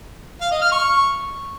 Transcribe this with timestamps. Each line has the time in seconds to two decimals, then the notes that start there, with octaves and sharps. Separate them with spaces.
0.41 F5
0.51 D#5
0.62 F6
0.72 C#6